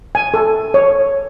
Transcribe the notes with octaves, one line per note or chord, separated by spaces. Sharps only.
G#5
A4
C#5